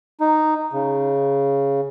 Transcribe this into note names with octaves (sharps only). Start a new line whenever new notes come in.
D#4
C#3